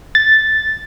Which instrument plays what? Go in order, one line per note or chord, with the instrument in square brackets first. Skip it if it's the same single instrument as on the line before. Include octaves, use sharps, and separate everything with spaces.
[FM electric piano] A6